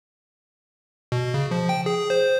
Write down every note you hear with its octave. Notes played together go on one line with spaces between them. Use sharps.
B2
C#3
F3
G5
G#4
C5